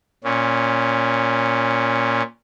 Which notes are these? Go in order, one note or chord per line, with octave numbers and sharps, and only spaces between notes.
A#2 C#4